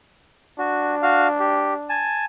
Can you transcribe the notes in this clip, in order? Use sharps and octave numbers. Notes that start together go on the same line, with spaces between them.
D4 F#4
F#4 F5
G4
G#5 A5